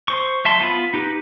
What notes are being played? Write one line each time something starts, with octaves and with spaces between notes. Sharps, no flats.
C5 C#6
F#3 E5 A5 C6
B3 F4 B5
D#4 G4 B4